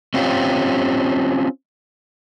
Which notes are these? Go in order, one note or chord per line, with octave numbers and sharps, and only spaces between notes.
C4 C#4 F4 G4